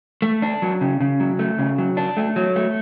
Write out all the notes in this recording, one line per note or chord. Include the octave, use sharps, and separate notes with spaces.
A3
D4
F#3
C#3
C#3
F#3
A3
C#3
F#3
D4
A3
F#3
A3